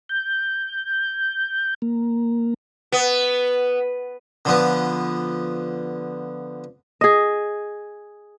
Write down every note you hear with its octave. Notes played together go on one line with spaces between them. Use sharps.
G6
A#3
B3
D3 F3 B3
G#4 D#5